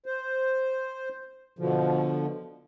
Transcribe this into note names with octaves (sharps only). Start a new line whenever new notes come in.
C5
B2 D3 F3